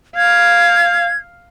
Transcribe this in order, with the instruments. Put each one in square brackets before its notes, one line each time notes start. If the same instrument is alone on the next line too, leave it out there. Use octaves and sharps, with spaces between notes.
[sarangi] F5 [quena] G#6